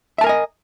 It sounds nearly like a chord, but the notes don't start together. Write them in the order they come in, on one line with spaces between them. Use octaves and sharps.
E5 A5 A#4 G#5 D#5